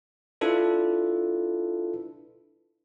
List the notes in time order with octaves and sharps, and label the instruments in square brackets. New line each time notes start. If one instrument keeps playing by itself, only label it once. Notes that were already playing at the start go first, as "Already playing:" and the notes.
[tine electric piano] D4 E4 F4 A4 B4